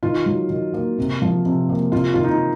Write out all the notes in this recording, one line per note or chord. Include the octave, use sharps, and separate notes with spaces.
D#3 F4
F#3
D#3
A#3
C3
F3
C3
A#3
C3 F4
D#3 F4
D#4